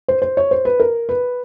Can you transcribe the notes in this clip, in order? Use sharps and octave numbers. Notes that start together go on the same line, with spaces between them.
C5
C5
C#5
C5
B4
A#4
B4